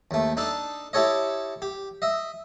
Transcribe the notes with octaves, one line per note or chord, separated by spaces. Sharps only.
D#2 A3
D4 D#4 A4
E4 G4 A4 C#5 D#5
G4
D#5 E5